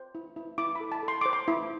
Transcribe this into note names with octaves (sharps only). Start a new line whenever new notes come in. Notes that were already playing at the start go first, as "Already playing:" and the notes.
Already playing: C5
E4
E4
E4 D6
A4 B5
A5
A4
C6
C5 D6
C6
E4